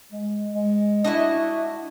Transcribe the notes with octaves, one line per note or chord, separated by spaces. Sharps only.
G#3
G#3
D4 E4 F#4 D#5